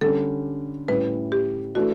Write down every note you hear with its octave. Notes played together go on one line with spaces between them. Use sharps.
D3 G3 C#4 A4
A2 G3 C#4 E4 B4
G4
E3 A3 D4 F#4 A4